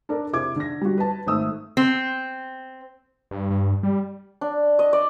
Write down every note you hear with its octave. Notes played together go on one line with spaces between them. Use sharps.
D4 A4 A#4 D5
C3 E4 G#4 D6 G#6
D3 A#6
G3 F#4
B4 A5
G#1 A3 D#6 E6
C4
G2
G2
G3
D4
D#5
D5